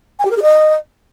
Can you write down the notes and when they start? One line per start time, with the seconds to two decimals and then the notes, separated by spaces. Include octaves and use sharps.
0.19 G#5
0.25 G4
0.31 A#4
0.36 G#4
0.42 D#5